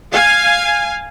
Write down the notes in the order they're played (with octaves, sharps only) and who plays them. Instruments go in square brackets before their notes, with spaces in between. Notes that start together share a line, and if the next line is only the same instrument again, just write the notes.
[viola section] F5 G#5